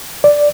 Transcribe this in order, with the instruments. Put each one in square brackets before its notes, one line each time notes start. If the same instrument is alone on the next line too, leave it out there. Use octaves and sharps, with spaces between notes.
[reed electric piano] D5